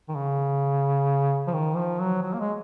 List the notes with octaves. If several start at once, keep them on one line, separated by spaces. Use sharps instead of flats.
D#3
C#3
F3
D#3
F3
F#3
F#3
A#3
G#3